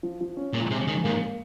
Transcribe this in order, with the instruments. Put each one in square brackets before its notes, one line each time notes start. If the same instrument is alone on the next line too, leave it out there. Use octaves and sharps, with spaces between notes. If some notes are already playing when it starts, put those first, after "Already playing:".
[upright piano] F3
F3
C#4
[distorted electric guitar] A#2 [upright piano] G#3
[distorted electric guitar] C3 [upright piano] G#3
[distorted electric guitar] D#3 [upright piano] G#3
[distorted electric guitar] G#2 [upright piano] A#3
[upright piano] A#3